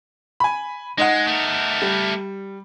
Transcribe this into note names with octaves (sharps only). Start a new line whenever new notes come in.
G#5 B5
G#3 D#4 D#5 F#5
A3 A#4
G3